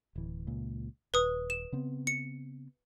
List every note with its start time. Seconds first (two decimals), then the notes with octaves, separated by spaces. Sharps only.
0.16 D1 E3
0.47 C#2 A#2
1.14 D#1 B4 D#6
1.50 E7
1.72 C#3 B3 C4
2.07 C#7